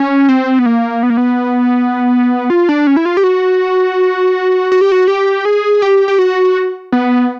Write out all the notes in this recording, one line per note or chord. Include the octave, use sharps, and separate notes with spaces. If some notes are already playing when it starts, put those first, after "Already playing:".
Already playing: C#4
C4
B3
A#3
B3
A#3
B3
F4
D4
C#4
E4
F4
G4
F#4
F#4
G4
F#4
G4
G#4
G4
G4
F#4
B3